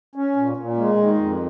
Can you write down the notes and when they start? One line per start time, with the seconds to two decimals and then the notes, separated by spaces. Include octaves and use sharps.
0.15 C#4
0.36 A#2
0.57 A#2
0.77 G#3
0.97 D#3
1.18 F2